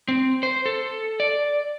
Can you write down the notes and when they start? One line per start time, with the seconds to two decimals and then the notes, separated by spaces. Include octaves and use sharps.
0.08 C4
0.43 C5
0.66 A4
1.20 D5